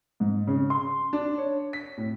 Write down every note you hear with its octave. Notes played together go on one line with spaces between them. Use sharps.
G#2
C#3
C6
D4
C#5
B6
A2